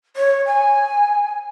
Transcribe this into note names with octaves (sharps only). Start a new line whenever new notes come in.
C#5
G#5